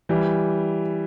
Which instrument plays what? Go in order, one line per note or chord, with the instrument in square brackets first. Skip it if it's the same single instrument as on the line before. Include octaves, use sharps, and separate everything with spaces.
[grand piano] E3 G3